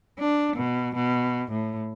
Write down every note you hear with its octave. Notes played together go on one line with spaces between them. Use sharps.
D4
B2
B2
A2